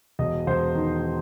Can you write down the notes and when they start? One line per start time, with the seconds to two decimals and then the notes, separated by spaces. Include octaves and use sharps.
0.19 E1 D#5
0.47 E1 C5
0.75 D#3